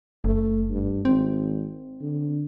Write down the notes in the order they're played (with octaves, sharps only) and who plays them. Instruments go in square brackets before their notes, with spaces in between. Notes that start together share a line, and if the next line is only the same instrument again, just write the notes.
[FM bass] F#1 [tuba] A3
[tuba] G2
[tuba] G#1 [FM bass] C4
[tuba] D3